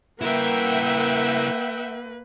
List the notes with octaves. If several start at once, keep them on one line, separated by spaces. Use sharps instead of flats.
A#3 E4 A#4 B4 E5 F#5 G5